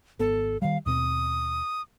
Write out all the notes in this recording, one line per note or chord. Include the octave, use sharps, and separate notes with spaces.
G#1 B3 A4
D#3 G3 F5
D#2 B2 C4 D#6